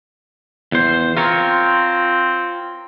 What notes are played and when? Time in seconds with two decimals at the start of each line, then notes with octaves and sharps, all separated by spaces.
0.72 E2 C5
1.17 C4 F4 A#4 C#5